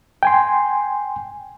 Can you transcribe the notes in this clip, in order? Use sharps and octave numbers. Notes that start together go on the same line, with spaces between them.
G5 G#5 C6